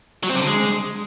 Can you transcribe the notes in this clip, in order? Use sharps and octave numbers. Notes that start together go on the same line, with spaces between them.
F#3
C4
C3
D3
G#3